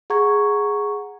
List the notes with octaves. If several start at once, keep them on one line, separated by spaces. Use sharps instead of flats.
G#4 F#5 A#5 C#6 G#6